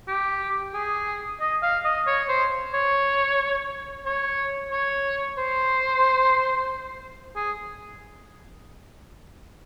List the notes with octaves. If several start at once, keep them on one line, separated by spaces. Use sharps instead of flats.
G4
G#4
D#5
F5
D#5
C#5
C5
C#5
C#5
C#5
C5
G#4